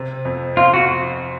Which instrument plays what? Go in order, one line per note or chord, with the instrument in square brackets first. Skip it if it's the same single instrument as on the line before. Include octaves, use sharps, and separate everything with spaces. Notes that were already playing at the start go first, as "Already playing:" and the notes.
Already playing: [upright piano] C3
F2
[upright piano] F2 [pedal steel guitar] F4
[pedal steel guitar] F#4